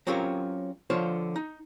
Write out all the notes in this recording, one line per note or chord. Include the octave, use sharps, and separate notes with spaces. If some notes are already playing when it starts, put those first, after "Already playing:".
F#3 C4 C#4 F4 G4 A#4
D3 F3 F4 C5 C#5 C6
D#4